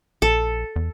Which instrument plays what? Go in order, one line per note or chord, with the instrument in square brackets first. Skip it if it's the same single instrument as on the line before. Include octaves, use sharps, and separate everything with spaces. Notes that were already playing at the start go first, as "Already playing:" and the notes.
[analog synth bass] A#1 [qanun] A4
[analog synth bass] E2